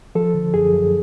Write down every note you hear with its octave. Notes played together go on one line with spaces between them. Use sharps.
F3 A4
D3
F#2 G#4
F#2